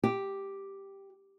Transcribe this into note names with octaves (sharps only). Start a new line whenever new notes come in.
G4